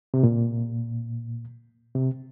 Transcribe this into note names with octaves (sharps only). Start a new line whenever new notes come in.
C3
A#2
C3